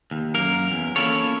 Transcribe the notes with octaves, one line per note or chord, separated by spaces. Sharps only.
D#2
F#2 A#3 A#4
E2
A#3 C#4 E4 F4 A4 C#5